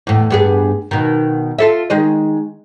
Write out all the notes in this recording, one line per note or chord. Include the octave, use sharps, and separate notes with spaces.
E2 A2
G2 B3 G#4
B2 D#3
F4 A4 E5
D#3 G#3 D#5